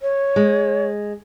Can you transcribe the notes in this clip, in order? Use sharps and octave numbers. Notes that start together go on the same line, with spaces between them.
C#5
G#3